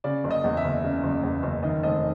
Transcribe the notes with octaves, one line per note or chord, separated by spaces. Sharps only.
C#3 D5
F#1
D#5
E2
E5
F#1
C#3
F#1
E2
F#1
D#3 D#5
F1 D#5